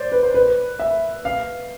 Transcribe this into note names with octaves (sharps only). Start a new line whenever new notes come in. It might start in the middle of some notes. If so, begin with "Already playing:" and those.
Already playing: C5 D5
B4
C5
B4
E5
F5